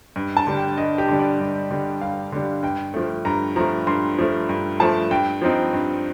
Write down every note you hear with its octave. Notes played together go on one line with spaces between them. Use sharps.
G2
A5
D3 G3
G5
G2 D#5
G4
D3 G3
D5
G2
D3 G3
G2 F5
D3 G3
G2 G5
F3 A3
G2 A#5
F3 A3 A#5
G2 C6
F3 A3
G2
F3 A3 A5
G2 G5
F3 C4 D#4
G2